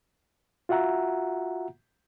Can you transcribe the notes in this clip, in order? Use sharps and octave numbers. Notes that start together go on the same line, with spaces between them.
F4 F#4 E5 F#5 A#5